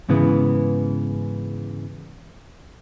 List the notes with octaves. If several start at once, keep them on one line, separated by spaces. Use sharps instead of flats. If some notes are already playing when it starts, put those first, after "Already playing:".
G#2 C#3 E3 B3